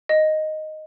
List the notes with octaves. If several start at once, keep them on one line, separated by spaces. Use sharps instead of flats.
D#5